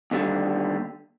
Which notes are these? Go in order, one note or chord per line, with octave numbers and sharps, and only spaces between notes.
D#2 D3 G3